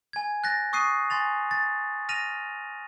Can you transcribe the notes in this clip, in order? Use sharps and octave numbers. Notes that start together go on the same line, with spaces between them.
G#5 G#6
F#6 A6 A#6
C#6 D#6 F#6 C7 D#7
G#5 C6 A6 F7
A6
F6 A#6 D#7 F7